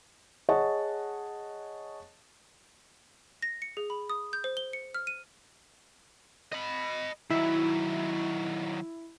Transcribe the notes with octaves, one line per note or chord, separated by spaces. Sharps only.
G#4 C#5 D#5 F#5 A5 C#6
A#6
C#7
G#4
B5
D#6
G6
C5
G7
C#7
F6
D#7
D#5 B5
D#3 F#3 E4